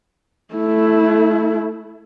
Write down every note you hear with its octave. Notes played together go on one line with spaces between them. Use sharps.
A3 E4